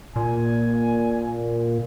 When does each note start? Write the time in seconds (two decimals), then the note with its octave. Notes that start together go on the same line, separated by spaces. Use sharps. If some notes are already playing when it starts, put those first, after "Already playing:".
0.16 A#2 G#5